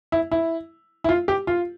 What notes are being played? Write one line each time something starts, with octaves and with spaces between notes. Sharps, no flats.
E4
E4
E4
F4
G4
F4